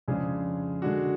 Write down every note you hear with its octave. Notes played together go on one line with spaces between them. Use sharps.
F2 C#3 G#3 D4 G#4
D3 G#3 D4 F#4